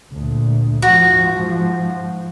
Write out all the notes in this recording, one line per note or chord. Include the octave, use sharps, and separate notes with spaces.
D2 A#2
G#2 F3 F#4